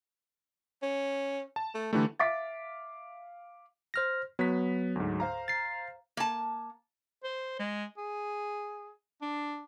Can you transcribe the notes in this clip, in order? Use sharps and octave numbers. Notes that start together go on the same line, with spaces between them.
C#4
A5
A3
D3 E3 G3 A3
E5 F5 D6 A6 B6
C5 F6 A#6
F#3 B3 B6
D2 G#2
C5 F5 A#5
A6 C7
A#3 A5
C5
G#3
G#4
D4